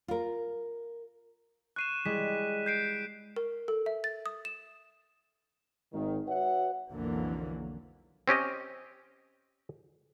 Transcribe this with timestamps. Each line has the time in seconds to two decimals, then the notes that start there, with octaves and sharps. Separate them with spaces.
0.08 F4 A#4
1.76 C#6 F#6 C7 D#7 E7
2.05 G3 G#3 E4 B6
2.66 G6 C7 D7
3.36 A#4
3.68 A4
3.86 E5
4.04 A6
4.26 D#6
4.45 E7
5.93 G#1 D#3
6.27 F#4 B4 C#5 E5 F#5
6.91 B1 F2 D3 E3 F#3 A#3
8.28 C4 C#4 G4 D#5